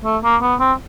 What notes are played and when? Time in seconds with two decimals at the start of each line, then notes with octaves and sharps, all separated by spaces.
0.05 A3
0.24 A#3
0.42 B3
0.60 C4